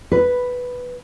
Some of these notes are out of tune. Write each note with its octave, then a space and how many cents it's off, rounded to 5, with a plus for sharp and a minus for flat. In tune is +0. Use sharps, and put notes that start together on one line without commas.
B4 +0